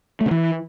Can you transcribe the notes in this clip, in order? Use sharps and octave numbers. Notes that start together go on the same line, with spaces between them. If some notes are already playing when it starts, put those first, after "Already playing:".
A3
C#3
E3